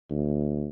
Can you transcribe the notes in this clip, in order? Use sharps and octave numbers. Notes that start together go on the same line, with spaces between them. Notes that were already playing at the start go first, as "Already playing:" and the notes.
D2